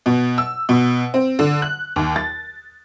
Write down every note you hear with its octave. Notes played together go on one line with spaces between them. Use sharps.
B2
E6
B2
C4
D3
F#6
D#2
A6